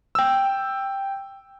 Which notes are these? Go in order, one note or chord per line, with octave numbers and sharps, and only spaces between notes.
G5 E6